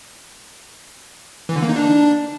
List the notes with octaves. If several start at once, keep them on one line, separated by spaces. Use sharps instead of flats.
E3
D3
A#3
D#4
D4